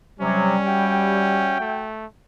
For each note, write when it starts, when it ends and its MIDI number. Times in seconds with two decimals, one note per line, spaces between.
0.20 0.55 48
0.20 0.55 54
0.20 1.60 55
0.20 1.57 61
0.65 1.86 66
0.65 1.86 76
0.65 1.86 79
1.60 2.06 57